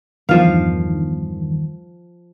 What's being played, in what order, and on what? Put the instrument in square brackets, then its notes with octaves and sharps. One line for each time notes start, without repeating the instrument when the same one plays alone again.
[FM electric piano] E2 G2 D#3 [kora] F3 F5